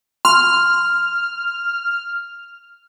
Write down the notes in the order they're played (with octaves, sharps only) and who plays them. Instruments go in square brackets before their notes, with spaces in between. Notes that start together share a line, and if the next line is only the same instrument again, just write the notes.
[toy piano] C6 [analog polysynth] F6